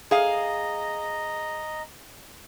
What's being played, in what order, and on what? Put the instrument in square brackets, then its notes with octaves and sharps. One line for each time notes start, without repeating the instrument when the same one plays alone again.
[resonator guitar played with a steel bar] G#4 F5 [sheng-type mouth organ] D#5 A#5